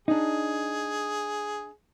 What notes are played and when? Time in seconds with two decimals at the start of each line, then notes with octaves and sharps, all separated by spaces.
0.08 D4 D#4 G#4